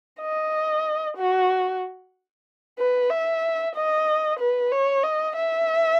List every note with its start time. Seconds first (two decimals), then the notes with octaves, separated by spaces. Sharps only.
0.21 D#5
1.17 F#4
2.79 B4
3.10 E5
3.75 D#5
4.39 B4
4.71 C#5
5.03 D#5
5.36 E5